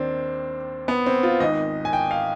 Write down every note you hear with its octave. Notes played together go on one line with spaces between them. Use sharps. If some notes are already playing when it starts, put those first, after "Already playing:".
Already playing: D#2 D#3 C4 D4
B3
C4
F4
G#1 G#2 D#3 D#5
G#5
G5
F5